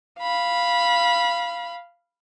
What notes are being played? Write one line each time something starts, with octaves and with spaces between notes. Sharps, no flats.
F5 B5